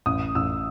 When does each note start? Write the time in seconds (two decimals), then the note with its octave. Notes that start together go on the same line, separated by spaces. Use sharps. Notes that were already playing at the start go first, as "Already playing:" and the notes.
0.06 A1 D#6
0.35 A1 E6